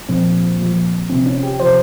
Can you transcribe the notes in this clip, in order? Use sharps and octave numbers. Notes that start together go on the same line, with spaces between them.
A#2 F3 C4
A#2 F3
C3 F3 C4
C#4
G4
C3 F3 C5